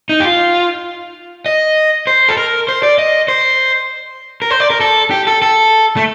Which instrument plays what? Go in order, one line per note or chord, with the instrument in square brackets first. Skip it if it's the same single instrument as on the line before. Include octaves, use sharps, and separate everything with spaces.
[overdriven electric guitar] D#4
G4
F4
D#5
C5
A4
A#4
C5
D5
D#5
C5
A#4
C5
D5
A#4
A4
G4
A4
A4
A3